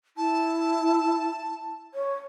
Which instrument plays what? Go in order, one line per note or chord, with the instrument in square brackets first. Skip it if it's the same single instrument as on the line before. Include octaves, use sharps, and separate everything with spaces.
[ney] E4 [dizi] A5
[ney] C#5